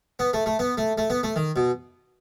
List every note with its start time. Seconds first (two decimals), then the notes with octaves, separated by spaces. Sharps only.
0.19 B3
0.33 A3
0.46 A3
0.59 B3
0.77 A3
0.98 A3
1.10 B3
1.23 A3
1.36 D#3
1.56 B2